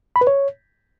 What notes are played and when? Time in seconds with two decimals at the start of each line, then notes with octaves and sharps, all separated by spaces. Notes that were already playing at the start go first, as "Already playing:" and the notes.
0.16 B5
0.21 B4
0.27 C#5